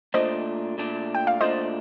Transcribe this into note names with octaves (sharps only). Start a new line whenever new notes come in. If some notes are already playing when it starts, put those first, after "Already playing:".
A#2 A3 D4 C5 D#5
A#2 A3 D4
G5
F5
A#2 A3 D4 C5 D#5